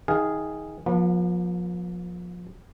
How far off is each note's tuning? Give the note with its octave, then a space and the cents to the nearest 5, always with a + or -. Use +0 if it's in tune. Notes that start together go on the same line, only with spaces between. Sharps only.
D#3 +25 G#4 +0 F5 +0
F3 +25 B3 -45